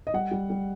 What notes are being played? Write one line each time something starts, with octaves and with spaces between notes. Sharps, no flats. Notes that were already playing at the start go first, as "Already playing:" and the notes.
D#5
G3 F#5
G3
G3